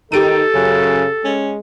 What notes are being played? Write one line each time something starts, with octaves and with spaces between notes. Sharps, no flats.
D#3 D#4 G4 A4 D7 D#7
F#2 C#3
G#3 C#4